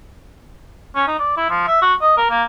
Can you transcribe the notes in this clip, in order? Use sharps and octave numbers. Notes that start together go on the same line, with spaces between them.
C#4
D#4
D5
E4
F3
E5
F#4
D#5
A#4
A#3